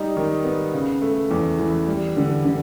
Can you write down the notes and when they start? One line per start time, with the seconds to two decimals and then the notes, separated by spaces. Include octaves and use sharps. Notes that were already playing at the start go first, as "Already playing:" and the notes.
Already playing: G3 D#4
0.17 D#3
0.45 B3
0.74 C#3
1.02 A3
1.31 E2
1.59 E3
1.88 G3
2.17 D3
2.45 D3